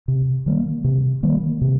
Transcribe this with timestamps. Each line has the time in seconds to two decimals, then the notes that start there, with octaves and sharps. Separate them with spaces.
0.08 C3
0.46 D#3 G3 A#3
0.84 C3
1.23 D#3 G3 A#3
1.61 C3